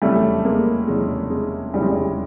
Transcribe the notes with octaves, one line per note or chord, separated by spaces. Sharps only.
F1 E2 C#3 F#3 G3 A3
G#3 A#3
F1 E2 C#3 F#3 G#3
G#3
F1 E2 C#3 F#3 G3
G#3
G3